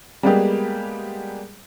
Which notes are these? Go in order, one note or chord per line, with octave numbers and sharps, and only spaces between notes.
G3 G#3 A#3 B3 G4 G#4